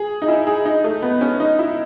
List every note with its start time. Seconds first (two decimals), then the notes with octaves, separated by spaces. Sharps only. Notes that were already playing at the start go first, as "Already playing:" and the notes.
Already playing: G#4
0.22 D#4
0.28 E4
0.47 G#4
0.65 D#4
0.84 A3
1.02 B3
1.21 C#4
1.40 D#4
1.59 E4